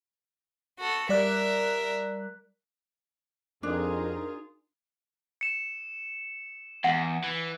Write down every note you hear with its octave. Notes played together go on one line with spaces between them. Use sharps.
F#4 A4
G3 A#4 D5 E5 F#6
F2 D4 D#4 F4 F#4 G#4 A#4
C#7 E7
E2 F#5
E3